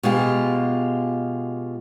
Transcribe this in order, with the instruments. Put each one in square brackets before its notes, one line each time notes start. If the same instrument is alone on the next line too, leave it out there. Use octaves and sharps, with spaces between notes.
[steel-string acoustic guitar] B2 G#3 F4 G4